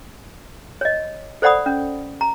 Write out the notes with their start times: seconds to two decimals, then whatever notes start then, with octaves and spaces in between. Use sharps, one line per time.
0.81 C#5 D#5
1.42 A4 C5 D5 F#5 B5 D#6
1.66 C#4
2.21 A#5